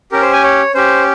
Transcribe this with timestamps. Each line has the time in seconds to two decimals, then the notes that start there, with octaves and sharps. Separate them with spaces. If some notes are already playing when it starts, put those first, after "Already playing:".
0.12 C#4 G4 A#4
0.22 C5
0.33 G#5
0.43 C#5
0.75 C#4 G4 C5